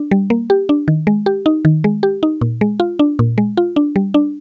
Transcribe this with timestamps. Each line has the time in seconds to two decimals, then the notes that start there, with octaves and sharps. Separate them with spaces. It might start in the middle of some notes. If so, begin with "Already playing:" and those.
Already playing: D4
0.11 G3
0.30 A#3
0.50 G4
0.69 D4
0.88 D#3
1.07 G#3
1.26 G4
1.46 D#4
1.65 D#3
1.84 G#3
2.03 G4
2.23 D#4
2.41 A#2
2.61 G#3
2.80 F4
2.99 D4
3.19 A#2
3.38 G#3
3.57 F4
3.76 D4
3.96 G3
4.14 D4